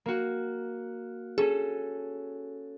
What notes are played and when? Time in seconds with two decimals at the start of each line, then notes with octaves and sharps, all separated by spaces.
0.06 A#3 F#4
1.38 C#4 G#4 A4